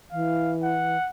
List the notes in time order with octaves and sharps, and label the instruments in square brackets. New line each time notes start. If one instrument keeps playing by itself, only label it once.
[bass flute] E3 [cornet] F5
[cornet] F#5